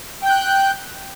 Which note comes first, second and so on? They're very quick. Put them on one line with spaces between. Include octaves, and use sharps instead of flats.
G5 G6 F#6